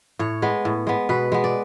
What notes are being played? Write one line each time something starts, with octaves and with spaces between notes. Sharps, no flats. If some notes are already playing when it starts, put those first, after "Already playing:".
A2 C#5
G#3 B3
A2
G#3 B3
B2 B4
G#3 B3
D5